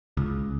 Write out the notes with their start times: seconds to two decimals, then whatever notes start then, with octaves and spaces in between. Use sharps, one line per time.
0.17 C#2